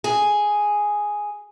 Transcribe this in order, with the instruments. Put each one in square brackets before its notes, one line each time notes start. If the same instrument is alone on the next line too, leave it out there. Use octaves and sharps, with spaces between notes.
[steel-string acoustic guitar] G#4